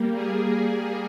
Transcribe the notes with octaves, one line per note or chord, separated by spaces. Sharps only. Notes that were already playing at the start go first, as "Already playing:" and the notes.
Already playing: G3 A#3
G#4